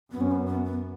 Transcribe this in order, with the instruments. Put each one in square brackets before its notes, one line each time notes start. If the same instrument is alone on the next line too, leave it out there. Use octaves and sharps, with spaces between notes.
[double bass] F#2 [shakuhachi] B3
[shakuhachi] C#4
B3
B3
B3